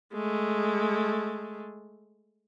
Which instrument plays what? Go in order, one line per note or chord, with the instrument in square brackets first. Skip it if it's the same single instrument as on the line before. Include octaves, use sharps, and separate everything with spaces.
[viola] G#3 A3